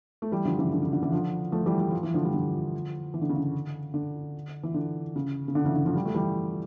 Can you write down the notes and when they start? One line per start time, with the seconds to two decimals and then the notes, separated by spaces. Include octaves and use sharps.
0.22 A3
0.32 E3 G3
0.45 D3 F3
0.59 C#3 E3
0.72 D3
0.83 C#3
0.93 D3
1.02 C#3 E3
1.12 D3 F3
1.52 F3 A3
1.66 E3 G3
1.80 G3
1.90 F3
2.03 E3
2.14 D3 F3
2.25 G3
2.33 D3 F3
3.14 E3
3.22 D3
3.29 C#3
3.36 D3
3.94 D3
4.63 E3
4.74 D3
5.16 C#3
5.48 C#3
5.55 D3
5.65 C#3 E3
5.76 D3
5.86 D3 F3
5.96 G3
6.05 A3
6.14 E3 G3